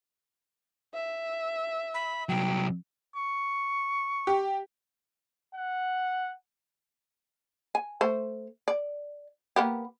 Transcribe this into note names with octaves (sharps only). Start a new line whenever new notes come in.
E5
B5
C2 F#3 G5
C#6
G4
F#5
G#5
A3 C5
D5
A#3 B3 G4